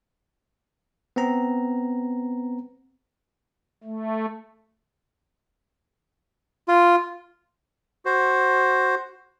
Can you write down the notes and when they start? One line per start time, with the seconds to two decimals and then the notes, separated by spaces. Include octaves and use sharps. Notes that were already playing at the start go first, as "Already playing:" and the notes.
1.16 B3 C4 A#5
3.83 A3
6.68 F4
8.05 F#4 C5